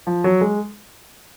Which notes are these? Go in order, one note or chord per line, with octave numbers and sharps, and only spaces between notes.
F3
F#3
G#3